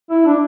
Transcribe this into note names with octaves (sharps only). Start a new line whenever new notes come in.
E4
D4